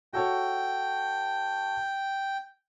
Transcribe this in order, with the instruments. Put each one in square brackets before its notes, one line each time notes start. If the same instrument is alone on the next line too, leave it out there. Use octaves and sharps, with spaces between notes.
[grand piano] F#4 A4 C#5 [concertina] G5